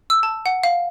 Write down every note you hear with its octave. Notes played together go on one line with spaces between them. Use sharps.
E6
A5
F#5
F5